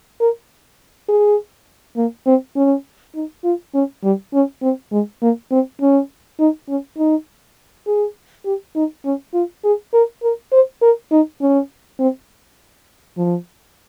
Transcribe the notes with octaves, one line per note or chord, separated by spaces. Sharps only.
A#4
G#4
A#3
C4
C#4
D#4
F4
C#4
G3
C#4
C4
G#3
A#3
C4
C#4
D#4
C#4
D#4
G#4
G4
D#4
C#4
F4
G#4
A#4
A#4
C5
A#4
D#4
C#4
C4
F3